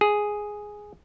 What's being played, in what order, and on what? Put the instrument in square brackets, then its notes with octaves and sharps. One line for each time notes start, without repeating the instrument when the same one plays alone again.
[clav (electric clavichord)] G#4